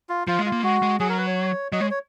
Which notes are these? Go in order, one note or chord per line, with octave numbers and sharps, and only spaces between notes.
F4
F3 F4
G#3
F4
A#3
G#3 F#4
G#3
F#3 G#4
A#4
B4
C#5
F#3 D#5
G#3 C#5
C#5